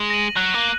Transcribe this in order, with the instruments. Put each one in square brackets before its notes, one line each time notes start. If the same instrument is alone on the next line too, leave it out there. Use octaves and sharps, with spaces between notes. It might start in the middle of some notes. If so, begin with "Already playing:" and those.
Already playing: [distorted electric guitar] G#3
[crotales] A#6 D#7 F#7
[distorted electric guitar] F#3 [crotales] F#6
[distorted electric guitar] A#3
[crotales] F#7